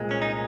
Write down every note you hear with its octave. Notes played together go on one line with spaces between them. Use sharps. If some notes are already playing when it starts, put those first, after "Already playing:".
Already playing: C2 A#2 G#3
C#4
D#4